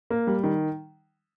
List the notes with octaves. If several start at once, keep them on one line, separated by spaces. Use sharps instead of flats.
A#3
G3
D#3